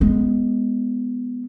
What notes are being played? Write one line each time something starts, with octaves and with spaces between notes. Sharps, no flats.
G#3 B3